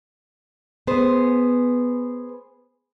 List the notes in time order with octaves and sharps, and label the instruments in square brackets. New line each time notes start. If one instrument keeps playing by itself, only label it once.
[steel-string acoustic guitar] B3 G#4 C5